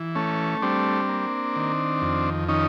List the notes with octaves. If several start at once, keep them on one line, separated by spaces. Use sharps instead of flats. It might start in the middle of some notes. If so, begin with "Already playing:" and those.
Already playing: E3
A3 C#4
G3 C4 D4
A#3
D#3
F2
D#3 C#4 D#4